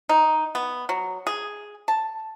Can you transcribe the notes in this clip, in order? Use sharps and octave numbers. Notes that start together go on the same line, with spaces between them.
D#4
B3
F#3
G#4
A5